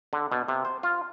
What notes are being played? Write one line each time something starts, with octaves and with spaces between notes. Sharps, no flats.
D3
B2
C3
C5
F4